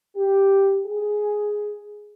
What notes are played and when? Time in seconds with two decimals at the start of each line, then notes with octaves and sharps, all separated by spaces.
0.16 G4
0.86 G#4